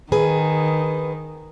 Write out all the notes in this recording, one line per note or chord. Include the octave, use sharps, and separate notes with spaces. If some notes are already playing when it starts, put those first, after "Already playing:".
D#3 G#4 B4